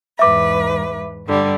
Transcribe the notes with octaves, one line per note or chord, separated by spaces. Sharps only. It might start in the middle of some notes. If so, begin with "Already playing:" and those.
E2 G#2 B4 E5 D6
G2 D3 G3